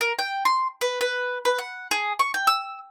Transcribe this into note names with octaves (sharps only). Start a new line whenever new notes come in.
A#4
G5
C6
B4
B4
B4
F#5
G#4
C#6
G5
E6